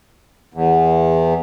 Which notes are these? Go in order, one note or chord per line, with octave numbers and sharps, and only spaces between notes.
E2